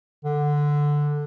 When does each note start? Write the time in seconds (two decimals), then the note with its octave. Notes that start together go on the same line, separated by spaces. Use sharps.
0.24 D3